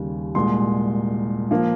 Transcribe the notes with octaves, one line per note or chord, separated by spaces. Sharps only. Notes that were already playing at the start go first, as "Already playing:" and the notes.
Already playing: D#2 C#3 G3
C2 A#2 G#3 C6
F3 A#3